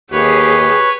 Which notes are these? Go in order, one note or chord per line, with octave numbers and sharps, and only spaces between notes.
D#2 G4 G#4 B4 C#5